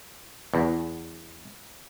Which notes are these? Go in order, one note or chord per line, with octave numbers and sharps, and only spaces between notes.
E2